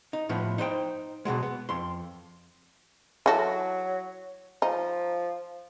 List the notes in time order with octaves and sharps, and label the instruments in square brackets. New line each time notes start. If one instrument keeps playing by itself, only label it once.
[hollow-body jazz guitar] D#4
A2 F3 B3
D#4 C5 D#5 G5
B2 D#3 F#3 G#3
B3
F2 C6
[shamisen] E3 F#4 A4 [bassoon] F#3
[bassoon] F3 [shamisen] D#4